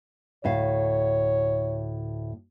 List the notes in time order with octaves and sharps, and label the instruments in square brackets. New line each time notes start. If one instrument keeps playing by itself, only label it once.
[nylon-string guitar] D2 A2 F5 [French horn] C#5